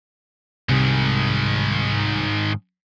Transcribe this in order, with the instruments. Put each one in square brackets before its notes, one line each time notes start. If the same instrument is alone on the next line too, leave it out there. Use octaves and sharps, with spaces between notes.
[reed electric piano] C2 C3 G3 [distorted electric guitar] G#2 D#3